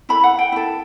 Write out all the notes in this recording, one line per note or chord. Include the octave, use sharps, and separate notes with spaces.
E4 A4 B5
F#5
G5
E4 A4